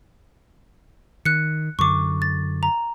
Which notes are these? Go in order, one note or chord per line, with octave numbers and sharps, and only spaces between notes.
D#3 F#6 C#7
F#2 D3 C#6 D6
A6
A#5